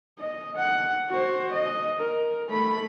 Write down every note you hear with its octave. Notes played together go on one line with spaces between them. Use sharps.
D#5
F#5
F#4 C5
D#5
A#4
A3 B5